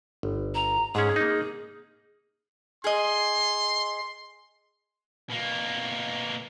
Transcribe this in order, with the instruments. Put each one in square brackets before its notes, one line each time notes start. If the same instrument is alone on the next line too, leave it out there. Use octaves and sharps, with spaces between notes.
[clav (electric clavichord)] G1
[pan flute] A#5
[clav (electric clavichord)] G#2 C#4 [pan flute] G#4
[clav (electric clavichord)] A#3 D#4
[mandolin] G#4 D#5 [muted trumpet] C6
[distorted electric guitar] B2 A#3